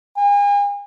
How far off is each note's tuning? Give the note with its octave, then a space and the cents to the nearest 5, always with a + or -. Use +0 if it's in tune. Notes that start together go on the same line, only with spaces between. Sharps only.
G#5 -40